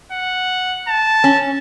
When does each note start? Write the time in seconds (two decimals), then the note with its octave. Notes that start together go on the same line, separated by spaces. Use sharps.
0.12 F#5
0.88 A5
1.24 C#4